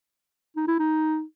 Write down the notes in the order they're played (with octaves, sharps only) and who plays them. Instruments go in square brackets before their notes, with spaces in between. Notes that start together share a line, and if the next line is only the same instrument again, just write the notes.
[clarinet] D#4
E4
D#4